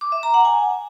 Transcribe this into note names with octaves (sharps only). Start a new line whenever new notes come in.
D6
E5
A#5
F#5
G#5